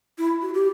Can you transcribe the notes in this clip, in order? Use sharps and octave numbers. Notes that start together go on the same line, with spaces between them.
E4
F#4
G4